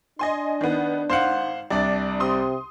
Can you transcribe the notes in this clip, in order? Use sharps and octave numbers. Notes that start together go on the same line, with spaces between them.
D4 D#5 G#5 C6
D#3 B3
G#1 C5 F5 F#5
C2 D4 D5
C3 C6 D#6